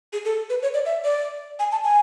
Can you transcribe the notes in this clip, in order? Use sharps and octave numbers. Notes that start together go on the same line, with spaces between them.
G#4
A4
B4
C#5
D5
E5
D5
G#5
A5
G#5